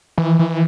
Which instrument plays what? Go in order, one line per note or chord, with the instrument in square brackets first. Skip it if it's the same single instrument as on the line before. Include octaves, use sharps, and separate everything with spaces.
[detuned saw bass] E3
E3